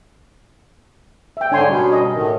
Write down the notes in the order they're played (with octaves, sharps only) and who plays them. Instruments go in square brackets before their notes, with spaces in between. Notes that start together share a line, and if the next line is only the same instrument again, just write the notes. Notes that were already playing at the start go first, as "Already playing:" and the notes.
[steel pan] E5 G5
[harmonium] G#2 D3 C#5 [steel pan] D4 G#5 C6
[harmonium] B2 G3 C#4
[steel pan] D#5
[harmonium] A2 D#3